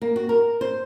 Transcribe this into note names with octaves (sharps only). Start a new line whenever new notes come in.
A#3
F#4
A#4
C5